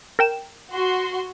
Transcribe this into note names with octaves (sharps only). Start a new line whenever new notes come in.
A#4 G5 E7
F#4 C6